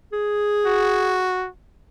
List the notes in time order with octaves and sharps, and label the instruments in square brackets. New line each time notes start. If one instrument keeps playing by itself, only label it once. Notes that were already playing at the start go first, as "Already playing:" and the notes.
[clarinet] G#4
[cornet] F#4